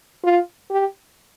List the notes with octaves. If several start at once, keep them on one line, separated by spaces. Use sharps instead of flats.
F4
G4